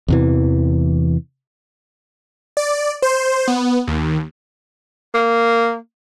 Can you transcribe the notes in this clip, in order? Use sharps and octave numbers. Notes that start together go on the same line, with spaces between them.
E2 C3 E3
D5
C5
B3
D#2
A#3